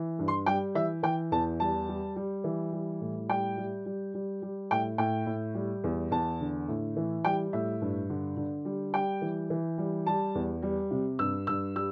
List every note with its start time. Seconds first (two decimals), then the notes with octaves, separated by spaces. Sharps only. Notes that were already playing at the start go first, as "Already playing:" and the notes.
Already playing: E3
0.19 G2
0.28 C6
0.46 G3 G5
0.75 E3 E5
1.03 E3 G5
1.32 E2 A5
1.60 G3 A5
1.89 G3
2.16 G3
2.44 E3
2.73 G3
3.01 A2
3.29 G3 G5
3.58 G3
3.86 G3
4.14 G3
4.42 G3
4.71 A2 G5
4.98 A2 G5
5.26 A2
5.54 G3
5.84 E2
6.11 E2 A5
6.40 D3
6.68 A2
6.96 E3
7.25 G3 G5
7.53 A2 E5
7.81 G2
8.10 D3
8.37 D3
8.65 G3
8.93 G3 G5
9.22 E3
9.50 E3
9.78 G3
10.06 G3 A5
10.35 E2
10.63 G3
10.91 C3
11.19 G2 E6
11.47 G2 E6
11.75 G3 E6